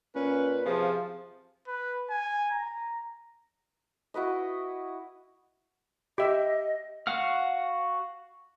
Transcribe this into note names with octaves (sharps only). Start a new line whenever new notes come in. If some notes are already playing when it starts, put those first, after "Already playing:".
A#2 C#4 B4
C3 F3 G#4
B4
G#5
A#5
E4 F#4 B4 D#5
G4 D#5 E5
F#4 F5 F#5 F6